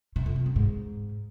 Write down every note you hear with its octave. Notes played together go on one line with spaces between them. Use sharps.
C3
F2
C3
F#2
G#2